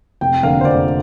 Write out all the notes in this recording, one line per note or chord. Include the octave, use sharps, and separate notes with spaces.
F1 G5
F2 D3 A#3 F5
C5
F1 D5